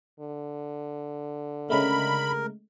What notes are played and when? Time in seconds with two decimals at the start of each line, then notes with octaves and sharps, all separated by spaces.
0.20 D3
1.70 C#3 G#3 A3 A#4 B5